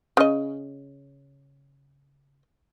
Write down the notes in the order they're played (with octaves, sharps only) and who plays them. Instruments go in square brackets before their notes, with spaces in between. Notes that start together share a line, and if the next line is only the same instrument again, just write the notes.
[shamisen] C#3 D#5